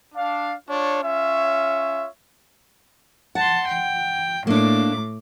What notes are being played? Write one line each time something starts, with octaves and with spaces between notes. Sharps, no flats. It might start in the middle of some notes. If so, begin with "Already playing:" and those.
D4 F5
D4 F4 C#5
C#4 F4 C#5 E5
F#5 A5 C6
G5
A2 A#3 D4 D6